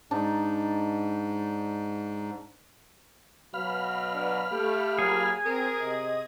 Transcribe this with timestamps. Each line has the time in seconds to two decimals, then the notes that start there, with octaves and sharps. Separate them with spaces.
0.11 G#2 D4 D#4
3.54 B2 F#3 B4 F5 B5 F6
4.15 D4
4.52 A3 G4
4.99 F3 F#3 A#3 G#4
5.45 C4 A#4 D#6
5.80 C3 D#5